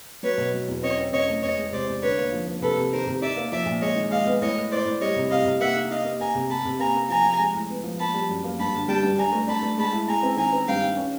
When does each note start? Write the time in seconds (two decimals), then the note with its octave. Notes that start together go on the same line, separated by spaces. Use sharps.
0.23 F#3 B4 C#5
0.38 B2
0.54 F#3
0.68 E2
0.83 C4 C#5 D#5
0.98 C4
1.13 C#3 C#5 D#5
1.28 A3
1.42 E2 C#5 D#5
1.57 G#3
1.72 C3 C5 D5
1.87 E2
2.02 D3 B4 C#5
2.17 A#3
2.32 F3
2.47 A#3
2.62 C3 A4 B4
2.77 C3
2.92 D#3 A#4 C5
3.07 C3
3.21 D#4 D5 E5
3.36 A#3
3.52 F3 D5 E5
3.66 A#2
3.81 G#3 C#5 D#5
3.96 D#3
4.11 G#3 D#5 F5
4.26 B3
4.41 A2 C#5 D#5
4.56 A2
4.71 A2 C5 D5
4.85 A2
5.01 G3 C#5 D#5
5.16 C3
5.30 C3 D#5 F5
5.45 C3
5.60 A#3 E5 F#5
5.76 D#4
5.90 D#4 D#5 F5
6.05 A#3
6.20 A#3 G#5 A#5
6.35 C3
6.49 C3 A5 B5
6.65 C3
6.79 A#3 G#5 A#5
6.95 A#3
7.09 F3 G#5 A#5
7.24 F3
7.39 G#3
7.55 A2
7.69 B3
7.84 F3
7.99 A#3 A5 B5
8.14 G3
8.29 F#2
8.44 A#3
8.58 G2 A5 B5
8.74 D3
8.88 G3 G5 A5
9.03 G2
9.18 D4 G#5 A#5
9.33 A3
9.48 D4 A5 B5
9.63 A3
9.78 G#3 A5 B5
9.93 E4
10.07 G#3 G#5 A#5
10.23 C4
10.37 D#3 G#5 A#5
10.52 C4
10.67 G2 F5 G5
10.83 D#3
10.97 C#4